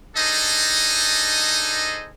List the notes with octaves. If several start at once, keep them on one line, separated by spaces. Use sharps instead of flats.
D4 D#4 G#4 A4 C5 D#5